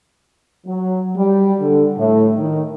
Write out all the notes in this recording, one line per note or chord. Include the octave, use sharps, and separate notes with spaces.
F#3
G3
D3
A2
D#3